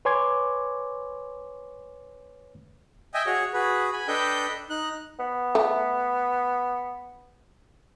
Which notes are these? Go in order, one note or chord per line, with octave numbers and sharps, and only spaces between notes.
B4 C#5 G#5 C6 D6 G#6
D#5 E5 G5 G#5
F#4 G#4 C#5
F#4 G#4 B4
G#5 B5
D4 A4 B4 D#5 G5 G6
D#4 F#6
B3
A3